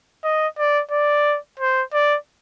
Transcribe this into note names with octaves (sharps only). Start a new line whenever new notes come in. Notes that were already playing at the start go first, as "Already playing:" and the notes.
D#5
D5
D5
C5
D5